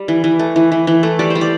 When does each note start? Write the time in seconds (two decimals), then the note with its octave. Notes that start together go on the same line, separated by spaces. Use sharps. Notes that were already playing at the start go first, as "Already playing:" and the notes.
Already playing: G3
0.08 E3
0.24 E3
0.39 A3
0.56 E3
0.72 E3
0.87 E3
1.03 A3
1.19 G3 D5
1.30 G3 C5
1.41 D5